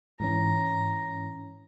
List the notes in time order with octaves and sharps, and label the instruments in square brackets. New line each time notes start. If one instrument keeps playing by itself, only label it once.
[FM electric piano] G#2 E3 C#4 [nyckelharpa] A#5